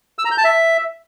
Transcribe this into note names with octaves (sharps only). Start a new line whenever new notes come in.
E6
A#5
G6
A5
E5